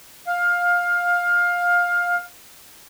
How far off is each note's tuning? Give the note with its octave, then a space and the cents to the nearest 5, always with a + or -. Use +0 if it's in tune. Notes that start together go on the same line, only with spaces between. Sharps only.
F5 +15